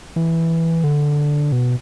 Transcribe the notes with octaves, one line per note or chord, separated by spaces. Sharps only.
E3
D3
B2